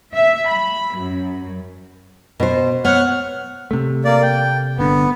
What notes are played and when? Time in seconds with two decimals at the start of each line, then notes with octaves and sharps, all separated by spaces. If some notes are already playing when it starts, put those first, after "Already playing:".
0.13 E5
0.50 B5
0.98 F#2
2.40 B2 C5
2.85 B3 C#5 F#5 F6
3.71 C3 A3
4.05 A#3 D5
4.22 G5
4.78 G1 D3 B3